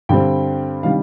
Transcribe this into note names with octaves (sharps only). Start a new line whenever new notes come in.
G2 D3 G3 C4 G5
C3 D#3 G3 D4 F5